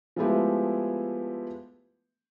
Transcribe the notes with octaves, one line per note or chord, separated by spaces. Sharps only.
F3 G#3 A3 B3 E4 G4